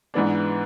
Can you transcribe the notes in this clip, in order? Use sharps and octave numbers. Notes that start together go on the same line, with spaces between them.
G#2 E3 B3 D4